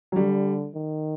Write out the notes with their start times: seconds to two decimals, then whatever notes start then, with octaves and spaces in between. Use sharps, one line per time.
0.12 F#3
0.16 D3 G3
0.74 D#3